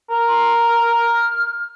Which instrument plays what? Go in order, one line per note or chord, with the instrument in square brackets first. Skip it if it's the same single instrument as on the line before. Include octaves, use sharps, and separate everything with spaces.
[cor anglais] A#4
[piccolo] C6
F6
F6